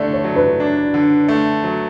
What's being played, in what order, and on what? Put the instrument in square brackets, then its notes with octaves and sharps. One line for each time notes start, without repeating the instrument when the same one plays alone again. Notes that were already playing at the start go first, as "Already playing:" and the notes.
Already playing: [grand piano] D3 A3 [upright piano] D5
[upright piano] C#5
[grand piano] F#3
[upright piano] B4
[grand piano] D4
D3
A3
F#3